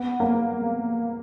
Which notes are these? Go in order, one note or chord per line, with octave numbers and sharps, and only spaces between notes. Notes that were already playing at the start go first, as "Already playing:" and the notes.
Already playing: B3
A#3